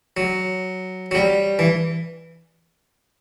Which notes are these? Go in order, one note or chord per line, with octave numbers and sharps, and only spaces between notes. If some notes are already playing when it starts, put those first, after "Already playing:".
F#3
F#3
G3
E3